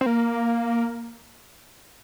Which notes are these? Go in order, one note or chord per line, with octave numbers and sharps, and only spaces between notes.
C4
A#3